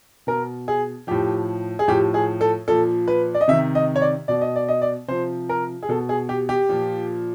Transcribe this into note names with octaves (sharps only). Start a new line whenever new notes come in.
B2 A#4
G#4
A2 F3 G4
G#4
A2 F3 G4
G#4
A4
A#2 F3 A4
B4
D5
D#5
C3 D#3 E5
D#5
C#5
D5
B2 D5
D#5
D5
D#5
D5
C3 F3 C5
A#4
G#4
B2 A4
G#4
G4
G4
A#2 F3